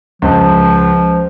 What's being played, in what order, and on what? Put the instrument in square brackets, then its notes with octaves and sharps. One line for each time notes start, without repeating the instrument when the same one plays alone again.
[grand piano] C#2 [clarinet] F3